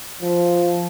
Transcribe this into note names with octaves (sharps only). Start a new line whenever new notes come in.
F3